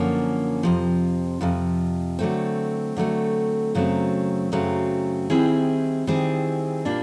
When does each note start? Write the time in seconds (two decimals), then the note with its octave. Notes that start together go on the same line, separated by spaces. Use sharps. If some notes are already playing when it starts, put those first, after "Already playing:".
Already playing: F#2 D3 F3 A#3 C#4
0.63 F2 C3 F3
1.41 F2 C3 F3
2.19 D3 F#3 A3 C4
2.97 D3 F#3 A3 C4
3.75 F#2 C#3 F#3 A3 C4
4.52 F#2 C#3 F#3 A3 C4
5.30 D#3 G3 C4 E4 G#4
6.07 D#3 G3 C4 E4 G#4
6.85 A#2 G3 A#3 D4